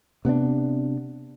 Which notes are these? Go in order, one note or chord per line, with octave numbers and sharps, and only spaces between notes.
C3 B3 C4 D4